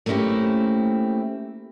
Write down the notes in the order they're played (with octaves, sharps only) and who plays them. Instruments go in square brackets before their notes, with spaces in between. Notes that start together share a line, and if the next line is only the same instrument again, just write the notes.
[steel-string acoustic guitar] A3 A#3 C4 C#4 E4 G4